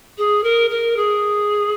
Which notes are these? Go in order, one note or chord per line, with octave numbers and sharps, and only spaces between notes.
G#4
A#4
A#4
G#4